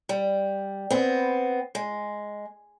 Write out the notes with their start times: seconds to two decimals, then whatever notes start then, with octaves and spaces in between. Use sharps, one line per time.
0.09 G3
0.90 B3 C4
1.75 G#3